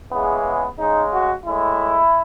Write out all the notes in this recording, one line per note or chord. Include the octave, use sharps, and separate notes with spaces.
C#3 E3 G#3 B3
B3
C#3 G#3 D#4
F#4
A2 G#3 E4